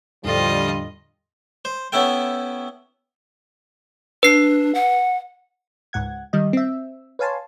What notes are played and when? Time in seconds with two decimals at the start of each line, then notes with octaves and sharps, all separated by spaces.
0.24 E2 A2 D3 F3 G3 F4 A4 D#5
1.65 C5
1.92 B3 C#4 E4 A4 G5
4.23 D4 B4 C7
4.74 F#5
5.93 C#2 G#2 F#5 G#6
6.33 D#3 G3 D#5
6.53 C4 E5
7.19 B4 C#5 F5 G#5 A5 C6